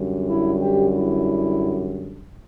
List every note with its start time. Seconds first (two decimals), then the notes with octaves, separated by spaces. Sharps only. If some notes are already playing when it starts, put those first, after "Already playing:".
Already playing: F#2 D3 G3
0.27 E4
0.60 G4
0.94 E4